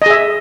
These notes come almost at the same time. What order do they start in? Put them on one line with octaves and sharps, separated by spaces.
D#5 G#4 E5